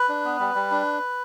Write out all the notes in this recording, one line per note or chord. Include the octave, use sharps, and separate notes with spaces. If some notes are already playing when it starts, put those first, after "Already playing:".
Already playing: B4
D4
B3
G3
G3
D4